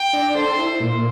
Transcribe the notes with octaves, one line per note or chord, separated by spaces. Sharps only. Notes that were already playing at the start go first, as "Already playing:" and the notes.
Already playing: G5
D4
A4 C5
E4
A#2